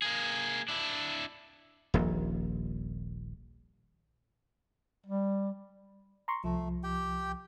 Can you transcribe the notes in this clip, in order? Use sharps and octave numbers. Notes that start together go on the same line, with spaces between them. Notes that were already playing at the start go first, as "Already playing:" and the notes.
A#3 G#4
D4 E4
D#1 A#1
G3
A#5 C6 C#6
C2 F3 A3
G4 G5